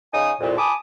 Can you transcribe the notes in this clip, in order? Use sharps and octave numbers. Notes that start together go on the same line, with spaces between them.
C#3 D#4 G#5 D#6
C2 F2 A#2
G#5 A5 B5 D6 D#6